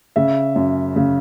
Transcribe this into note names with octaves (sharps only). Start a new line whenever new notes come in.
C#3 E5
F#2
C#3